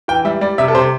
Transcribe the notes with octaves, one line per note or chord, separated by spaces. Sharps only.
E3 G5
G3 E5
G3 D5
C3 E5
A4
C3 C5